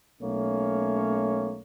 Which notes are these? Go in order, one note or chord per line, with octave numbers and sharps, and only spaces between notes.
B1 A3 A#3 C#4 C#5